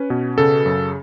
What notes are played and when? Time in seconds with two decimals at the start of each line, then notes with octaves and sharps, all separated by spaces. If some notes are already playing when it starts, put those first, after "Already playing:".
Already playing: C#4 B4
0.10 B2
0.38 C#3 A4
0.66 F#2